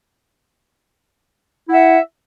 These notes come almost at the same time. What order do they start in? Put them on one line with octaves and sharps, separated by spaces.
E4 F#5 E5